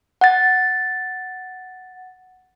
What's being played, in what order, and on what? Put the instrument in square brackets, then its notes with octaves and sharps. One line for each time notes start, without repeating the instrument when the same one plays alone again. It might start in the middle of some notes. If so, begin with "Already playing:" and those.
[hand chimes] F#5 A6